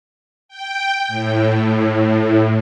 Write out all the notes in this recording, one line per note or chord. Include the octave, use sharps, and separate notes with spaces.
G5
A2